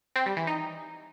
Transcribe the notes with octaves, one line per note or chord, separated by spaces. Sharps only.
C4
G3
E3
D#4